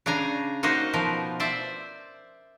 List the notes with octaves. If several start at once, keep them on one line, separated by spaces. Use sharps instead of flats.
C#3 D4 G#5 A#5
A#3 D#4 F#4 C5 D#5
B2 F3 A#4
C5 D5 E5